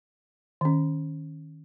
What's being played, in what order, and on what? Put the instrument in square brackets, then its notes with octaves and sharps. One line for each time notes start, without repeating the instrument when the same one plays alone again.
[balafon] D#3 C#4